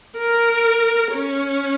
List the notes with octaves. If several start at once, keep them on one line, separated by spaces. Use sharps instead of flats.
A#4
C#4